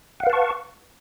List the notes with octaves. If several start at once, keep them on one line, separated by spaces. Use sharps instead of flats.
B4 F5 F#5 A5 C#6